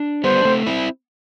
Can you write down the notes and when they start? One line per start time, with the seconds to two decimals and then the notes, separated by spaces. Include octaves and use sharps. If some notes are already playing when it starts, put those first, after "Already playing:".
Already playing: D4
0.24 G3 B3 C5
0.37 D4
0.45 A3 C4
0.66 C4 E4